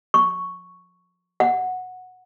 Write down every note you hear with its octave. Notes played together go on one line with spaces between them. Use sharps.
C#6
F#5